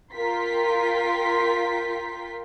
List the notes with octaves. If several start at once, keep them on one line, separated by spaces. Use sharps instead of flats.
F4 A#4 G5 C6 B6